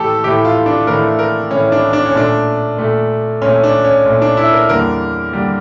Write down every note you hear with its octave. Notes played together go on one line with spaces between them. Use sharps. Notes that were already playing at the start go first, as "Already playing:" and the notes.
Already playing: A2 E3 A3 G4 A4
A2 E3 A3 G4
F4
D4
A2 E3 A3 A#4
A#4
A2 E3 A3 C#4
D4
D4
C#4
A#2 A3 D4
A#2 A3
A#2 A3 C#4
D4
C#4
A#2 A3
D4
E4
A#4
E2 D3 G3 A#3 A#4
D3 G3 A#3